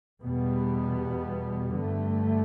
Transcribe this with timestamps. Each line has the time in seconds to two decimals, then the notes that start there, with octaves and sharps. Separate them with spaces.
0.23 E2 B2 G3 B3
1.78 G2 D3 A3